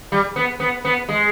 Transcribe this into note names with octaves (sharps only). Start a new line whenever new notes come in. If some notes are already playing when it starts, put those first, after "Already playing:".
G3
B3
B3
B3
G#3